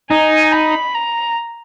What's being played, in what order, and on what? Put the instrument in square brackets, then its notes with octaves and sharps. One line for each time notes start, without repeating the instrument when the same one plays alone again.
[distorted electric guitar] D#4 [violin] G#5
[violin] B5
A#5